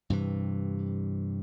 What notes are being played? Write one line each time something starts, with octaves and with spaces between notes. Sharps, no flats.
G2 C3 E3